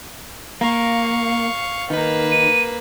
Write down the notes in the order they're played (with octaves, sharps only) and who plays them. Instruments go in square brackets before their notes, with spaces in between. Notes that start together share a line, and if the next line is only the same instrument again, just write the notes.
[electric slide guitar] A#3 [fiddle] F5 C#6
[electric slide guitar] D#3 [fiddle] A#3 B4
[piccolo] D#7